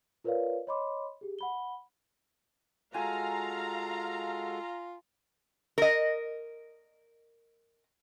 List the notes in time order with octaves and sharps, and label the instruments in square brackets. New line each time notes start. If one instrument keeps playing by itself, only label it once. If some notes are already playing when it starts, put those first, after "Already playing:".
[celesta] F4 A#4 B4 C#5 D5 F5
C#5 D#5 B5 C6 D6
G4 G#4
F#5 B5 G7
[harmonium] G#3 F#4 A4 [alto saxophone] F4 [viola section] F5 A#5 [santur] G#5
[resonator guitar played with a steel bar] A#4 D#5